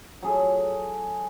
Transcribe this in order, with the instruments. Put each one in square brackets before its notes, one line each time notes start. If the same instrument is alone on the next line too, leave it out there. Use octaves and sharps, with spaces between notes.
[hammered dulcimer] F#3 G#4 A4